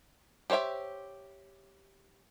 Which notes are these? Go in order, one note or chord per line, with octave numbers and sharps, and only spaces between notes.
G4 C5 C#5 E5 G5